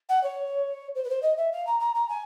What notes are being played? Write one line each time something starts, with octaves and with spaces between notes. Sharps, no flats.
F#5
C#5
C5
B4
C5
D#5
E5
F5
A#5
A#5
A#5
G#5